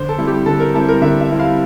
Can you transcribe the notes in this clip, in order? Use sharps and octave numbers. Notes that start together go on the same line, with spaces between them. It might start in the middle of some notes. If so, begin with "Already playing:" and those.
Already playing: D3 C5
A4
G3 C4 E4
G4
D3 A4
A#4
G3 C4 E4 A4
A#4
D3 E5
E5
G3 C4 E4
F5